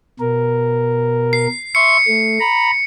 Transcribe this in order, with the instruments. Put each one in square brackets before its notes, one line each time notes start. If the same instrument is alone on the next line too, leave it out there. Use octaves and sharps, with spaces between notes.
[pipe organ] B2 A#4
[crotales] C7
[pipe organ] E5 C6 C#6 [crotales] C#7
[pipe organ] A3
A#5 B5